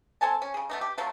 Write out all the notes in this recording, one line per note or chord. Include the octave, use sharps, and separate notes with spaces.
C4 A4 G#5 A5
C#4
C#3 G#4
A3 B3 D#4
G4
F3 F#3 A3 F4